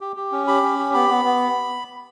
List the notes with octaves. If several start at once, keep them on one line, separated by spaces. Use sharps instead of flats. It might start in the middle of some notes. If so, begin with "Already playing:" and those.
G4
G4
C#4
G4 B5
C#4
G4
B3 B5
B3
B3